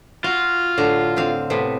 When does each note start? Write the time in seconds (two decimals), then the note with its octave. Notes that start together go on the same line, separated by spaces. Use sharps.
0.24 F4 F#4
0.78 A2 D3 A#5
1.16 D3 C4 F5
1.50 A2 C3 B3